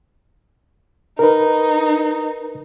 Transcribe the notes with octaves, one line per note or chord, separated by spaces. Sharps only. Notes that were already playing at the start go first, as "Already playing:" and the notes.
D#4 A#4 B4